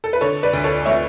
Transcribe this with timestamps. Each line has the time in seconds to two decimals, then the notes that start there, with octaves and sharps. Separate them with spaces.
0.04 A4
0.13 B4
0.21 D3 A4 C#5
0.43 B4 D5
0.53 D2
0.64 A4 C#5
0.85 A3 C#5 E5